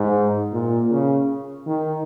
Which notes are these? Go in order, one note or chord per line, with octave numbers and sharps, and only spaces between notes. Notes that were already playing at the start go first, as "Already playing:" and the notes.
Already playing: G#2
A#2
C#3
D#3